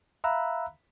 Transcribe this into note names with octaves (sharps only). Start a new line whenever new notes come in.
E5 F5 A#5 B5 E6 F#6